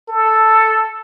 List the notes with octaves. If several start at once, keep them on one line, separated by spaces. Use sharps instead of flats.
A4